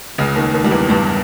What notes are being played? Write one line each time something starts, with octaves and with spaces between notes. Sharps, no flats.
C#2 C#3
D#2 D#3
D#2 D#3
G3
E2 E3
G2 G3